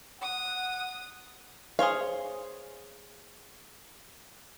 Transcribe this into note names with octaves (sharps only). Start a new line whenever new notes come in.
F#5 D#6
G#4 C5 C#5 F5